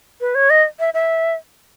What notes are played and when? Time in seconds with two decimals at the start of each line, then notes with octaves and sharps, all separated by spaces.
0.21 B4
0.35 C#5
0.50 D#5
0.80 E5
0.94 E5